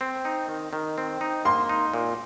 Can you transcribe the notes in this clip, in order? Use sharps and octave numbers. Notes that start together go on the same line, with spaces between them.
C4
D#4
D#3
D#3
C4
D#4
A#3 C6
D#4
A#2